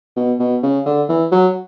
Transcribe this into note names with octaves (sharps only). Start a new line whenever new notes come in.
B2
B2
C#3
D3
E3
F#3